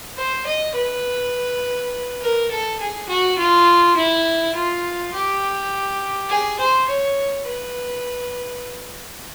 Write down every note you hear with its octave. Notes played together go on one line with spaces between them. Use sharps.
C5
D#5
B4
A#4
A4
G#4
F#4
F4
E4
F4
G4
G#4
C5
C#5
B4